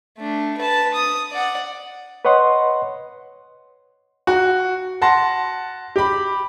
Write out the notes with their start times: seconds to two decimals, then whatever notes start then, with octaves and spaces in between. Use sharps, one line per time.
0.19 A3 D4
0.57 B4 A5
0.94 D#6
1.32 D5 F#5
2.25 B4 C#5 D#5 F#5 C6
4.27 F#4
5.02 F#5 A5 C6 A#6
5.96 G4 B5